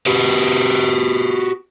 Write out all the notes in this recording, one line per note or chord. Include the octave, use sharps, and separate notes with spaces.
F#4 G4 B4